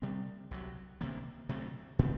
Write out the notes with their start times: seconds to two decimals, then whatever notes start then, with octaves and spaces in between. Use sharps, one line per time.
0.02 C3 G3 C4
0.51 C2 C3 F#3
1.01 D2 C3 F#3 A#3
1.49 D2 C3 F#3 A3
1.99 A#2 A3 C4